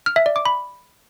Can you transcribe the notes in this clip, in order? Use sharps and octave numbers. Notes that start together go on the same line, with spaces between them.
F6
E5
D5
D6
B5